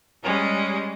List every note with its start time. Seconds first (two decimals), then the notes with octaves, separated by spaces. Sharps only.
0.23 G3 G#3 C#4